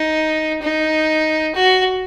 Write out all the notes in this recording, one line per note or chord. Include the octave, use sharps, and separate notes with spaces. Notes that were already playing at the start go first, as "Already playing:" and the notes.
Already playing: D#4
D#4
F#4